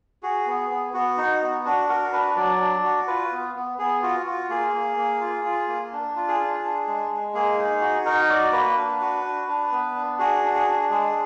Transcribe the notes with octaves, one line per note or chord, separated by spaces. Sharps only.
F#4 G#4
B3
B3
B3 F#4
D#4
B3
D4 F#4
F#4 A#4
D4 B4
F#3 D5
D4
F#4
F4 B4
B3
B3
B3 G#4
F4 F#4
F4 F#4
A#3 G#4
A#3
A#3
F4
F4
A#3
D4
F4
G#4
D4
D4
G#3
G#3
A#3 G#4
D#4
F#4
D#4 A#4
F#4 D5
A#3 B4
D4
F#4
D4
D4
B3
D4
F#4 G#4
D4
G#4
D4
G#3 G#4